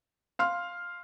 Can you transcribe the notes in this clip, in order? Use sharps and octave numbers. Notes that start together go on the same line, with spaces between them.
F5 C6 F6